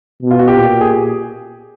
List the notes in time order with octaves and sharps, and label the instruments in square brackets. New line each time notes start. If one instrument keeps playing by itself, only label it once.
[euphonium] B2
[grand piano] F4
F#4
G4
[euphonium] A#2
[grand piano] G#4